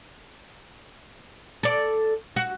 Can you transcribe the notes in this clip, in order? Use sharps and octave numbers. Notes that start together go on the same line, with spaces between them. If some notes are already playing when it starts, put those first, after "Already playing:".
A4 D5
F#4